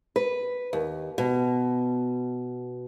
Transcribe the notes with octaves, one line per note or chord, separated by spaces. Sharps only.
B4
D#2
B2